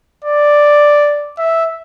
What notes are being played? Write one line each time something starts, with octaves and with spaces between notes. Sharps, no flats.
D5
E5